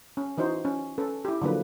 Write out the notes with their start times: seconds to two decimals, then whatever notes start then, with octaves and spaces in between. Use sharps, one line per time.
0.17 C#4
0.38 E3 D#4 F#4 C5
0.65 C#4
0.98 C#4 A4 B4
1.25 E4 G4
1.42 D3 F3 F#3 A#3 B4